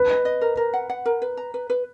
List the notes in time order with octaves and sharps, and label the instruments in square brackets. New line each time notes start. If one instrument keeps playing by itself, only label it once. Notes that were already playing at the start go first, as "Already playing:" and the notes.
Already playing: [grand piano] B4
[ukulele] D#5
D#5
A#4
A#4
F#5
F#5
A#4
B4
A#5
B4
B4